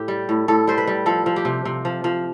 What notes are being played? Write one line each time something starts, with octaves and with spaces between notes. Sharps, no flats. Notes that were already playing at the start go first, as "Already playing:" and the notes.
Already playing: A2 G4
G3
A2
A2 A4
G3 C5
B4
G3
F3 A4
F3
G4
C3
C3
F3
F3